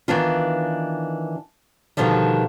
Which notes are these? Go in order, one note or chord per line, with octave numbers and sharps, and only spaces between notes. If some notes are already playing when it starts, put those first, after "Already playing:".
D#3 E3 B3 D4 F4
B2 D3 D#3 F3 G3